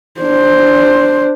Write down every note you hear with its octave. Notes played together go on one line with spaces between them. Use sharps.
D4 C5